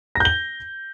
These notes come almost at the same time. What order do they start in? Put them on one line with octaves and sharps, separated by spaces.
A#6 G6 G7